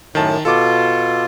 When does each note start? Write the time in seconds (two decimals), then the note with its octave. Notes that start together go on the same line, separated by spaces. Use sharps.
0.15 F#2 A2 D#3 A5
0.45 B2 F4 A4 D6